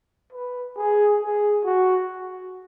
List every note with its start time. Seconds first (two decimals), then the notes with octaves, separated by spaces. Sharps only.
0.32 B4
0.76 G#4
1.20 G#4
1.65 F#4